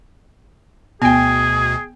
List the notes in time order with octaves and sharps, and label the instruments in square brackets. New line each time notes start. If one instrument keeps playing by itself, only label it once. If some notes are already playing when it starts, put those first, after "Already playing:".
[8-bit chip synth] D2 B2 [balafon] B3 [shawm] G#4 [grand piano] G5 G#5